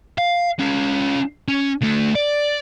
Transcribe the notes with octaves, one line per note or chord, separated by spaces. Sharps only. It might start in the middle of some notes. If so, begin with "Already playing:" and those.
F5
C#4 F4
C#4
D3 A3
D5